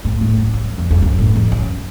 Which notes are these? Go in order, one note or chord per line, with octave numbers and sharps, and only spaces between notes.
A2
A2
F#2
F#2
F2
F2
F#2
A2
F2
F#2